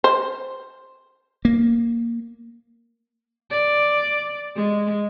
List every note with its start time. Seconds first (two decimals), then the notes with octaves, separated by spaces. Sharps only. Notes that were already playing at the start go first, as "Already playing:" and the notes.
0.04 C5
1.45 A#3
3.50 D5
4.55 G#3